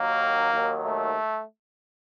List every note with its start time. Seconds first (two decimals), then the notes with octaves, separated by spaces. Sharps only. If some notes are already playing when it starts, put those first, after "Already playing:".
Already playing: D#2 D#3 F#3 A#3
0.53 D#2 D#3 F#3
0.84 A3